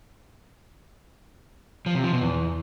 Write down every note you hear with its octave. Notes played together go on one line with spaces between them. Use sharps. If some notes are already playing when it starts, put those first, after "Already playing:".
F3
C3
F3
B2
E2